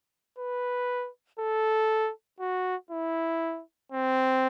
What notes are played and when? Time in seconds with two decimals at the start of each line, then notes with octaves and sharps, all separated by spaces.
0.38 B4
1.39 A4
2.40 F#4
2.91 E4
3.92 C4